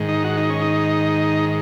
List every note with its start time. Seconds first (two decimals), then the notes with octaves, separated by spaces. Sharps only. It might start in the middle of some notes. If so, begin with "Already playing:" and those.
Already playing: G#2 D#3
0.09 D#4
0.24 F#4
0.37 D#4
0.50 C#4
0.62 D#4